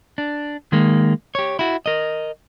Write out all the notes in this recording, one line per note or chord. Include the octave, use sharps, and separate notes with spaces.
D4
D#3 G#3 A#3
G4 C#5
E4 F#4
A#4 D#5